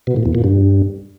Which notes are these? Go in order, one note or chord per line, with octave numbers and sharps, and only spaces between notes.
B2
A2
E2
A#2
G2